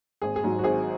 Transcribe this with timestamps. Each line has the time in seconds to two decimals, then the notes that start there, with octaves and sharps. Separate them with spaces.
0.22 G#1 G#4
0.36 G#4
0.44 G#2 F#3
0.59 F#4
0.64 G#1 G#4